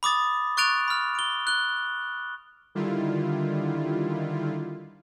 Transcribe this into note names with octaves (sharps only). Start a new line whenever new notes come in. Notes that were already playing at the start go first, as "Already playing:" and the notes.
B5 D6 D#6 A6
C#6 F#6 A6 D7 F7
B5 F6
D7 G7
F#6 G7
D3 D#3 G3 E4 F4